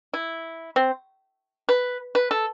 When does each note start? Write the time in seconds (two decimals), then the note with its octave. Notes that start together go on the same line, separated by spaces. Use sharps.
0.14 E4
0.76 C4
1.69 B4
2.15 B4
2.31 A4